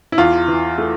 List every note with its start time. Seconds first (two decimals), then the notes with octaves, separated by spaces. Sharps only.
0.12 E4
0.18 E2 F4
0.48 E3
0.78 A3